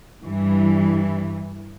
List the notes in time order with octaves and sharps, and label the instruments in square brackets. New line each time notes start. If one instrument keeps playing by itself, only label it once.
[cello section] G2 E3 G3